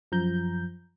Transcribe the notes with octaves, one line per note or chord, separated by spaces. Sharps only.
F#2 F3 A#5 G6